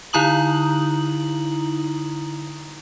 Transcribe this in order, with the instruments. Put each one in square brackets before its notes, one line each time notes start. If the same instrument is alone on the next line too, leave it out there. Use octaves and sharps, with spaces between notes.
[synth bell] D3 D#4 E4 A#5 D#6 F#7